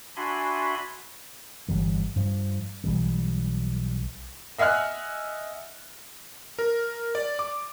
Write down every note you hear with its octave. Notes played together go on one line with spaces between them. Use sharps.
D4 F#4 E5 G#5 B5 C6
G1 E3 G3
G2 F3
B1 E3 G3
D#5 E5 F#5 G#5 F6 F#6
A#4
D5
D6